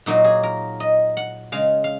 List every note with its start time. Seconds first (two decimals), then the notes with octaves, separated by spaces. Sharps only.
0.06 A#2 F#3 A#3 D#4
0.24 G#4
0.43 A#4
0.80 D#5
1.17 F#5
1.52 C#3 G#3 F5
1.84 F5